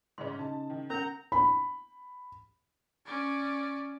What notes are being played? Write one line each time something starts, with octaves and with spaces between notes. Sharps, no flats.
G#2 C#3 C#4 C6
C#3 D#4 A5
D#3
C#4 A#4 F#5 A#5 G6
B5
C#4 D5